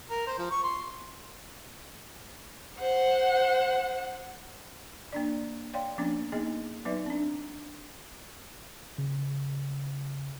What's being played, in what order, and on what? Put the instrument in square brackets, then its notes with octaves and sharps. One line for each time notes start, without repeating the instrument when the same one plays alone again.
[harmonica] A#4
C5
F3
C#6
C6
[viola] C5 F#5
[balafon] A#3 D4 D5
C#5 D5 F5 G5 C6
F3 A#3 B3 C#4 D4
A#3 B3 D#4 G#4 D#5
F#3 B3 D#4 B4 D5 E5
C4 D4
[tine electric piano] C#3